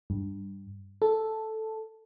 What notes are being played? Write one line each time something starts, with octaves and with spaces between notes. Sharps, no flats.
G2
A4